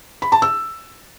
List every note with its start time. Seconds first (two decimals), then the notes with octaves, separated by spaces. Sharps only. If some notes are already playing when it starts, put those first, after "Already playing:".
0.22 B5
0.32 A5
0.42 E6